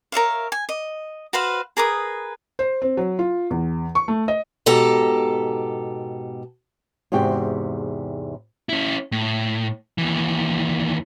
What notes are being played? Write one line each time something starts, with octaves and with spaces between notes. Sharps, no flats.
A#4 C#5 E5 F5
G#5
D#5
F#4 B4 C5 F5
G#4 A#4 B4 D#6
C5
C4
F#3
F4
E2
C#6
A3
D#5
G#2 B2 G4 A4 A#5
E2 G#2 C3 F#4 G5
C#4 E4
A2
D#2 E3